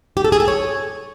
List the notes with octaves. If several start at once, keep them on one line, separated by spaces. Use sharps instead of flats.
G4
A4
G#4
A4
C#5